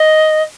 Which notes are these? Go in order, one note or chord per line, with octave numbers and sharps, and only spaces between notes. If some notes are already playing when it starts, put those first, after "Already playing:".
Already playing: D#5